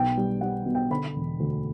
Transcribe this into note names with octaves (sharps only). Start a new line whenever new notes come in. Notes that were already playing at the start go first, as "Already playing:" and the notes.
Already playing: B1 B3 G5
G3
G3 F#5
B2
G5
D3 B5
E1
D2